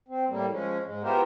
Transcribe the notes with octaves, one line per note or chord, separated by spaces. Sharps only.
C4
A2 G3 A#3
F3 G#3 C#4
G#2 G#3
B3 E4 F4 G4 A#4 C5